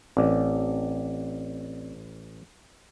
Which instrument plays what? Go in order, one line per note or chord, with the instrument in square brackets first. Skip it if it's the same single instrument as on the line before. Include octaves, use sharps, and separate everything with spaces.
[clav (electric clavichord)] A1 [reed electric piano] C4 D5